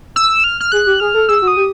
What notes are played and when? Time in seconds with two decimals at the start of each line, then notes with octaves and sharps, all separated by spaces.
0.16 E6
0.44 F6
0.60 F6
0.72 G#4 F#6
0.86 G4
1.00 G#4 F6
1.14 A4
1.29 G#4 E6
1.42 F#4
1.47 D#6
1.57 G4